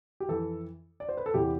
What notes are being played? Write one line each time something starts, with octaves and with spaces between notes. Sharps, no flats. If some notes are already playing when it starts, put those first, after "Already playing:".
G4
F2 E3 A4
D5
C5
B4
A4
E2 C3 E3 G4